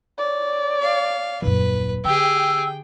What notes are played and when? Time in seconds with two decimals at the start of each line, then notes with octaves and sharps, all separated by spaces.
0.18 C#5 D5
0.82 F5
1.42 D#1 F#2 B4
2.05 D3 G4 G#4 G5 E6
2.37 G5